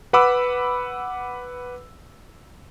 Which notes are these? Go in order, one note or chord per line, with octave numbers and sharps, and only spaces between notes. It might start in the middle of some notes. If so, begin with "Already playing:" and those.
B4 F#5 B5 D6 E6